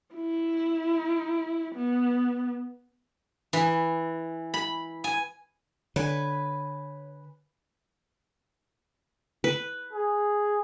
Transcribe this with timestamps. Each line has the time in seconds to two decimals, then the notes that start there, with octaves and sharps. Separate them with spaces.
0.15 E4
1.75 B3
3.53 E3
4.54 B5
5.04 G#5
5.96 D3 B4 C#5 G#5
9.44 B4
9.93 G#4